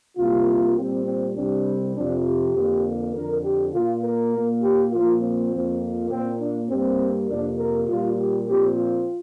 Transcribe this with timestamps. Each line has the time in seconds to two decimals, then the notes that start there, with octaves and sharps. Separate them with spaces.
0.18 C2 C3 A#3 F4
0.78 A#2 G3 C4
1.07 C4
1.36 C2 C3 G3 C4 D4
1.96 F2 C3 F3 C4 D4
2.26 G4
2.55 F2 D3 A#3
3.15 F2 D3 F3 A#4
3.44 G4
3.74 A#2 A#3 F4
4.03 A#4
4.33 A#2 A#3
4.63 G4
4.92 A#2 F3 A#3 F4
5.22 C4
5.51 F2 F3 A#3
6.11 A#2 A#3 C4
6.40 D4
6.70 G2 G3 A#3 C4
7.29 F2 C3 A#3 D4
7.59 A#4
7.88 A#2 G3 A#3 F4
8.18 G4
8.48 A#2 F3 C4 G4
8.77 F4